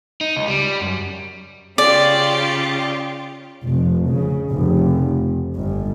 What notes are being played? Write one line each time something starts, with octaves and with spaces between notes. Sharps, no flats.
D#4
C#2
G3
F#2
C#3 F4 G4 D5
F1
C#3
F1
G1